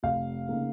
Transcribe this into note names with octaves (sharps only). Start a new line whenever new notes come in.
F1 F5
C#3 A#3 D#4